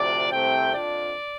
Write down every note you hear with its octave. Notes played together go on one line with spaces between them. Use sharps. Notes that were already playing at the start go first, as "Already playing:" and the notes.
Already playing: D2 C3 F3 D4 D5
C2 C3 A3 C4 G5
F2 F3 D4 D5